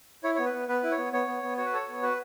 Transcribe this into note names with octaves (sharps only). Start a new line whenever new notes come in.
E4 C#5
B3 C#5
B4
B3
B3 B4
E4
C#5
B3
B3 C#5
B3
B3
F#4 C#5
B4
A4 C#5
B3
F#4 B4